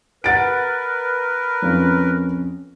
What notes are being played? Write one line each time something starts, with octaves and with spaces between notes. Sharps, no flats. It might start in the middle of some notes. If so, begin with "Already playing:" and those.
A#4 B4 F#5 A6 D7
F2 C#4 F4